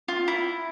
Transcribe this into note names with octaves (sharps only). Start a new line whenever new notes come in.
F4
E4